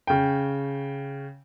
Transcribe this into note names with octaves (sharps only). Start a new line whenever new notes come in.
C#3 G5